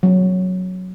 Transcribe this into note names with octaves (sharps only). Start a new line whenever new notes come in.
F#3